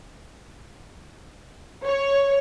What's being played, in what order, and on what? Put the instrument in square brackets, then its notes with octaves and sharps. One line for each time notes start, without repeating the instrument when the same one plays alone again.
[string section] C#5